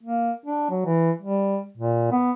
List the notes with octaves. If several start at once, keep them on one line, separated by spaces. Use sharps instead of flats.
A#3
D4
F#3
E3
G3
A#2
B3